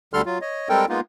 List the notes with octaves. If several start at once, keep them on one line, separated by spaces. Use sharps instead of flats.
D2 D3 G3 A4 C6 F6
F#3 F4
C#5 D#5
G3 G#3 C4 A4 A#4 G5
G#3 A#3 B3 D#4 F4